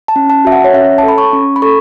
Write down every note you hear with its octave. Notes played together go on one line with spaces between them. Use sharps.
A5
C#4
A5
F#4 E5
F#5
C#5
C#4 E5
A5
A4
B5
C#6
C#4
B5
A4 C#6